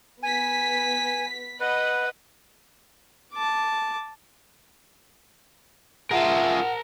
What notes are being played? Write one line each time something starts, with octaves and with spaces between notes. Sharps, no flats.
B3 G#5 B6
B4 D#5 F#5 B5
A5 D6
F4 G#4 A#4 E5 F#5 A5